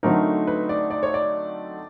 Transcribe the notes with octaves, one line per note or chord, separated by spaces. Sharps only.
D3 F#3 A3 C4 D#4 A#4
B4
D5
D5
C#5
D5